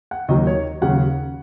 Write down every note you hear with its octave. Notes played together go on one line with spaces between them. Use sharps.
F#5
D#2 D#3 F#3 D#5
C#5
D#2 C#3 F#3 F#5